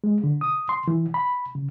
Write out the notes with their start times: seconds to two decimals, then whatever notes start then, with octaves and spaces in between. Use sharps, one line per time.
0.04 G#3
0.24 D3
0.41 D#6
0.69 C6
0.88 E3
1.14 B5
1.55 C#3